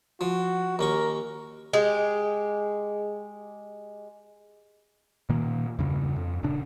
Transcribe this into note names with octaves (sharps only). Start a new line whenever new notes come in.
F3 F#4
D#2 C#4 A#4 C#6
G#3 G4
A#2 D#3 A#3
E2 G2 C#3
F2
D#1 A#2 C#3 D4